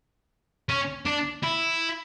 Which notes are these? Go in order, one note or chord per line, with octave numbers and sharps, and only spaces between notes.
C#4
D4
E4